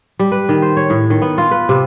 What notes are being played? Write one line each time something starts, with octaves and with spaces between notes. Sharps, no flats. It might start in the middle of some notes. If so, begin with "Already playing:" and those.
G3
B4
D#3
C5
C#5
A2
D#3
B3
F4
B4
C3